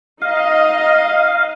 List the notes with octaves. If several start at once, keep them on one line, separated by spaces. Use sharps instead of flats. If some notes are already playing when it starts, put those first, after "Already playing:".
D#4 D#5 F5